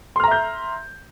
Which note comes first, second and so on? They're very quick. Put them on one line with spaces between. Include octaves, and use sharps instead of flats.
C6 F6 A#5 E5 G6